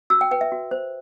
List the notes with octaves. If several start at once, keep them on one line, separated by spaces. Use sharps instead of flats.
F#4 E6
G5
B4 G5
E5
F#4
C5